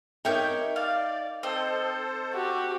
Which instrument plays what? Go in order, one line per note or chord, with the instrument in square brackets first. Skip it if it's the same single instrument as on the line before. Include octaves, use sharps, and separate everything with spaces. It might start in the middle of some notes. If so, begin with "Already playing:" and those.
[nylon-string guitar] D#4 A#4 E5 [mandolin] G4 C#5 G6
[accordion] D5 [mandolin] F5
[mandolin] C4 D#5 [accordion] A4 C5
[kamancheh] F#4 G4